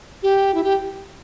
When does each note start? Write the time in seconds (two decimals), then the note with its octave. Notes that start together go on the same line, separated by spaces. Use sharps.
0.23 G4
0.54 E4
0.64 G4